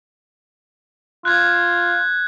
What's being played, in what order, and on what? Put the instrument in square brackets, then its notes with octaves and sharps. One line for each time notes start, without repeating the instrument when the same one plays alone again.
[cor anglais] F4 [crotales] F#6 G#6